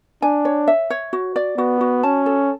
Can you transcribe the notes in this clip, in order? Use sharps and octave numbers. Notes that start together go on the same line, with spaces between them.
D4 G#5
C#5
E5
C#5
F#4
D5
B3 F#4
F#4
C#4 A5
A4